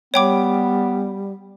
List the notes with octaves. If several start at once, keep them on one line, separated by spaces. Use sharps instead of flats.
G3 B3 C#5 G5 D6